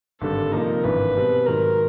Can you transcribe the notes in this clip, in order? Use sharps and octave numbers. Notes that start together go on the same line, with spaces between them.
G#1 G2 D3 G3 A4
C3 F3 A#3 D#4 A#4
G#1 G2 E3 B4
B2 G3 C4
G#2 D#3 F#3 A#4